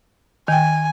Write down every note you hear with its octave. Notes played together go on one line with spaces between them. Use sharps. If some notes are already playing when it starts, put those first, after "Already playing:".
D#3 G5 G#5